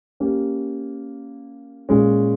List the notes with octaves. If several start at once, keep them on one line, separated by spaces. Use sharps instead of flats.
A#3 C#4 G4
A#2 G#3 C#4